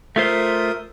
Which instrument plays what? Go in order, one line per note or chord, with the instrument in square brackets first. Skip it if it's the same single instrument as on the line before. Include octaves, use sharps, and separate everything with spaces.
[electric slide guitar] A3 F4 C5 [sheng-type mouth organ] A#4 E5 D#6